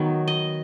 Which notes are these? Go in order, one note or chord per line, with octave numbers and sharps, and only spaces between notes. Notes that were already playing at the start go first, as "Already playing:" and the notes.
Already playing: D#3 F#3 B3
D#5